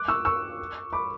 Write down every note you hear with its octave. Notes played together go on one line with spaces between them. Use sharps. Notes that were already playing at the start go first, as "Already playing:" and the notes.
Already playing: D6 F#6
C#6 E6
C#6 E6
B5 D6